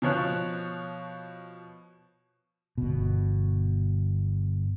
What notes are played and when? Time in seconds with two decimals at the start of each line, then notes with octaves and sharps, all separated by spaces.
0.02 B2 F3 C#5 F#6
2.78 G1 B2